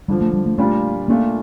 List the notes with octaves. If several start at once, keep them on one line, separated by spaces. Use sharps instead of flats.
F2 D3 F3 G3
A3
G3
A3
A#2 G3 A3 D4 F4
A#2 A3 A#3 D4 F4